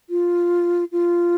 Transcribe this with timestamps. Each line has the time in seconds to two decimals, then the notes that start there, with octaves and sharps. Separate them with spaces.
0.10 F4
0.92 F4